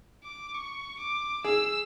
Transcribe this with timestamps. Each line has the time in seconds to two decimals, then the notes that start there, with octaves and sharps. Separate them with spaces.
0.24 D6
0.54 C#6
1.00 D6
1.44 G#4 E6